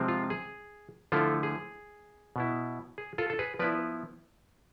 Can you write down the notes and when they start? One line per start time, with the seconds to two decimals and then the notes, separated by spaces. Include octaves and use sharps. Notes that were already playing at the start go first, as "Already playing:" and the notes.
Already playing: C3 F3 G#3 C4
0.08 F4
0.30 G#4
1.12 D3 F3 A3 E4 F4 A4
1.43 G#4
2.36 B2 B3 E4
2.98 G#4
3.18 F4 A4
3.30 A4
3.39 G#4 B4
3.59 F3 B3 E4 B4 D5